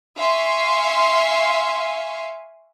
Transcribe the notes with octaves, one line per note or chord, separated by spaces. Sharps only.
E5 F5 G#5 C6 C#6